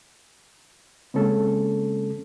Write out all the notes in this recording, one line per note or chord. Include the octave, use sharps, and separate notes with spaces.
C#3 G#3 A#3 C4 C#4 A4